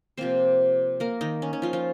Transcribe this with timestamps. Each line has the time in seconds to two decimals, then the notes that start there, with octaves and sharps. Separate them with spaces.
0.17 C3 F3 A#3 C4 C5
1.00 A#3 A#4
1.21 D#3 D#4
1.42 C#4
1.53 C#4
1.62 F3 F4
1.73 F3 F4